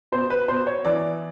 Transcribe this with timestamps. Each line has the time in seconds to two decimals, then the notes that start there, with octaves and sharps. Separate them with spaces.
0.12 B2 C5
0.30 B4
0.48 B2 C5
0.67 C#5
0.85 E3 D5